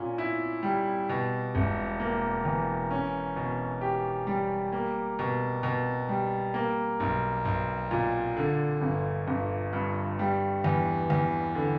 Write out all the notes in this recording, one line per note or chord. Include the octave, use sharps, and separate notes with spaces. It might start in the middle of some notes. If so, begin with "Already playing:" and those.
Already playing: A#2 C#4
E4
G3
B2
E1
A#3
E2
C#4
B2
G4
G3
A#3
B2
B2
G3
A#3
B1
B1
A#2
D3
G1
G1
G2
G3
E2
E2
D3